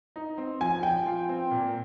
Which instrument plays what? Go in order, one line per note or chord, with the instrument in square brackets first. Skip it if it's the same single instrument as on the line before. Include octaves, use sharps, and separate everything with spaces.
[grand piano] D#4
C4
[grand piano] F3 [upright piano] G#5
[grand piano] F3 [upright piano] G5
[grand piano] F4
C4
A#2